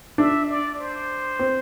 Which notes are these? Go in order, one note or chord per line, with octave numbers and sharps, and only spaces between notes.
D4 E5
D5
C5
C4